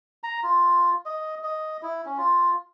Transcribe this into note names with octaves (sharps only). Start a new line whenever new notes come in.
A#5
F4
D#5
D#5
E4
C#4
F4